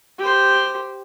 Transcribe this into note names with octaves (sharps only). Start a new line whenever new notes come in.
G4 C5